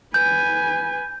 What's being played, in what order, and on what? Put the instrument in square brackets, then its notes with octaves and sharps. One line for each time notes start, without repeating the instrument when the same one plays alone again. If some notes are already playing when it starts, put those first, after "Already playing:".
[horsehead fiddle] B4 G#5 [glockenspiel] G6